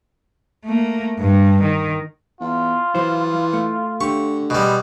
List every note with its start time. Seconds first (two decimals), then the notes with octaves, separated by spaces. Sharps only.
0.65 A3 A#3
1.19 G2
1.62 D#3
2.40 E2 F4
2.95 E3 F#3 C5
3.53 A3
4.01 D3 A3 G4 C#6
4.50 B2 G3 G#3